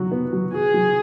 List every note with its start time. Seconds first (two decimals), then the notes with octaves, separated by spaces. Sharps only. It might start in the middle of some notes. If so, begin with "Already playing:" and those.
Already playing: F#3 F#4
0.12 B3
0.33 F#3
0.53 F#4 G#4
0.74 F#3